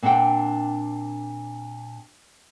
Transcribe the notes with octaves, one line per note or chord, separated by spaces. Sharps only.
A#2 C4 D4 F#5 G5